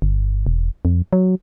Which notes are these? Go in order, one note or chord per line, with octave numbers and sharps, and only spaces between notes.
G1
E1
F2
F#3